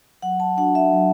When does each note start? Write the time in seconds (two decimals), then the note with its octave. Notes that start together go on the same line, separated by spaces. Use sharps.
0.22 F#3 F#5
0.40 A5
0.57 D4 F#4 F#5
0.75 E5
0.93 F#3